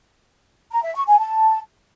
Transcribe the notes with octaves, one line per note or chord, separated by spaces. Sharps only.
A#5
E5
C#6
G#5
A5